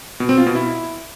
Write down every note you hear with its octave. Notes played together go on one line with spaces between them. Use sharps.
B2
C4
F4
B2
E4